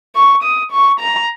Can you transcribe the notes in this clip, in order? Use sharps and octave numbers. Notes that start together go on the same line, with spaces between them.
C#6
D#6
C#6
A#5